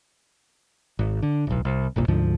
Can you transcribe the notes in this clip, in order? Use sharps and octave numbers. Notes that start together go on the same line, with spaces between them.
G#1
D3
D1 B1
C2
G1 C2 A#2
D2 G#2 D3 F3